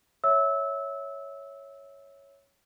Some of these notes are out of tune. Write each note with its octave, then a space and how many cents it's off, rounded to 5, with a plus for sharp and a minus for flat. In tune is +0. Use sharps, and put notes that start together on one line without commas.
C#5 +0 E5 -10 E6 -20